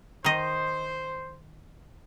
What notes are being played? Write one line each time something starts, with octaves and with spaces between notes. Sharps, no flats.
D#3 C5 D#5